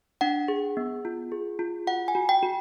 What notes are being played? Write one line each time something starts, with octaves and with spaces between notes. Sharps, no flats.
D4 F#5
G#4
B3
F4
G#4
F4
F#4 F#5
G#5
F#4
G5
F#4